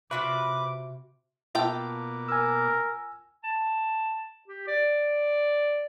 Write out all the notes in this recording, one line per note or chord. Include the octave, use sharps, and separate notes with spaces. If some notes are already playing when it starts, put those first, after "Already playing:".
C3 F4 F#4 B4 E5 D6
B2 A#3 F4 A4 G5 D6
A#4 G#5 E6
A5
G4
D5